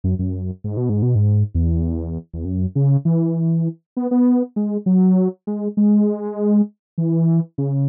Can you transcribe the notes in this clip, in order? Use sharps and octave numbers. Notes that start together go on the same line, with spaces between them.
F#2
F#2
G#2
B2
G#2
B2
G#2
E2
E2
F#2
C#3
E3
B3
B3
G#3
F#3
G#3
G#3
E3
C#3